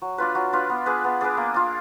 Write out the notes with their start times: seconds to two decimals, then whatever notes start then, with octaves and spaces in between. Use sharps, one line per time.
0.02 F#3
0.18 D4 F4 B4
0.35 F#3
0.53 D4 F4 B4
0.70 B3
0.86 D4 G#4 B4
1.04 B3
1.21 D4 G#4 B4
1.37 A#3
1.54 D4 F4